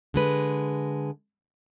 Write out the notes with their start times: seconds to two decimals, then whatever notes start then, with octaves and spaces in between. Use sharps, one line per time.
0.14 D3 G#3 B4